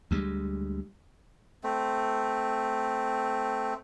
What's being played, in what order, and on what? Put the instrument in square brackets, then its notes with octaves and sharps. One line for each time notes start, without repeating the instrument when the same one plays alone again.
[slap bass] D2 G3 G#3
[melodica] A3 C4